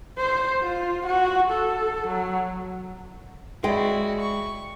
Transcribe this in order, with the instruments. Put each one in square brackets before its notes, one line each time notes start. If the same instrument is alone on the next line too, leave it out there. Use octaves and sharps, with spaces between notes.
[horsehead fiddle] C5
F4
F#4
A4
F#3
[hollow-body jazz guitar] G#3 [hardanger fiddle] E4 F#4 [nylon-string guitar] D5 G5
[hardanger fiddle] C#6